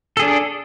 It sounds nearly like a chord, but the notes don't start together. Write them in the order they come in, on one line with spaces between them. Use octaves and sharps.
A4 G#4 D4